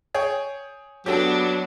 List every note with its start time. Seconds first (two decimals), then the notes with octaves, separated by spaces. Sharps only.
0.14 G#4 C#5 G5
1.06 F#3 B3 D4 G4 A4